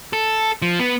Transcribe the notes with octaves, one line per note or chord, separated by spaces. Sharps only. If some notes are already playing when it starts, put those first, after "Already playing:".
A4
F3
B3